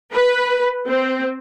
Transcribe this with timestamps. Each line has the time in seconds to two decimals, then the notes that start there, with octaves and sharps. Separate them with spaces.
0.13 B4
0.87 C4